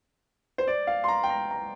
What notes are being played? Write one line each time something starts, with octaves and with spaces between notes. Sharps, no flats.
C5
D5
F5
C6
A#5
G5
A#5
A#5